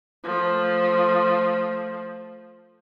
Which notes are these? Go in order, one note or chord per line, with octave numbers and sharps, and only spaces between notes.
F3 A3